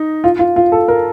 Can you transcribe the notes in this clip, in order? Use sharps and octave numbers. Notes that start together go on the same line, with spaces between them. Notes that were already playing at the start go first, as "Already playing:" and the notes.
Already playing: D#4
F4
F4
F4
A4
A#4